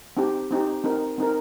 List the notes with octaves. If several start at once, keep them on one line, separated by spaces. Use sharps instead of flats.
C4 D#4 G4
C4 D#4 G4
C4 D#4 A#4
C4 D#4 A#4